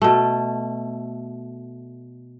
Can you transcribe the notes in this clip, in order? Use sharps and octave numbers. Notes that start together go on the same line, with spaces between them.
B2 A3